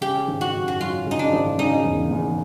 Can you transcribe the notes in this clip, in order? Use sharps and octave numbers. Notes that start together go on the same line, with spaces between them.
C#3 G4
G#1
F#4
F#2
F#4
F#3 F4
C#3 D#4
D4
G#1
C#3 D#4
E1
E2